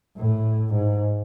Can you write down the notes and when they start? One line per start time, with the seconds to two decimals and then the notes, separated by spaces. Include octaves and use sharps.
0.17 A2
0.74 G#2